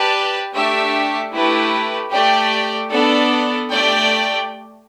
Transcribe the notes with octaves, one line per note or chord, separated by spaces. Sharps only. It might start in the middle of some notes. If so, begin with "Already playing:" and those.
Already playing: G4 B4 D5 A5
A3 D4 G4 E5
A3 E4 G4 B4
A3 G4 D5 G5
B3 D4 A4 D5
A3 G4 D5 G5